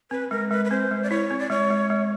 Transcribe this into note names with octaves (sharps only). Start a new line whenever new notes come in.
C4 B4
G#3 A#4
G#3 B4
B4
C4 C5
G#3
D5
E4 C#5
C4
D5
G#3 C#5
G#3
G#3